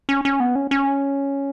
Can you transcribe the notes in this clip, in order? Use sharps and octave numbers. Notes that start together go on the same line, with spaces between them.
C#4
C#4
B3
C#4
C#4